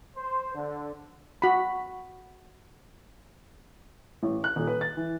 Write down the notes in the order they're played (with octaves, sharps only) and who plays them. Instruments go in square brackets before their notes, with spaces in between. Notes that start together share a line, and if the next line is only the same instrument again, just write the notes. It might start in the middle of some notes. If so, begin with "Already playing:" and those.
[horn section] C5
D3
[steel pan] F#4 B5
[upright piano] A1
F#6
D#1
B4
A6
E3